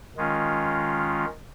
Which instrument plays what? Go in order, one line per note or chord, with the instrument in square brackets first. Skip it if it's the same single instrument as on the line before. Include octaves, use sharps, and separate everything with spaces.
[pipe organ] D#3 G#3 C#4 F4